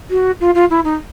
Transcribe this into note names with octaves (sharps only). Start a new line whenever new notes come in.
F#4
F4
F4
E4
D#4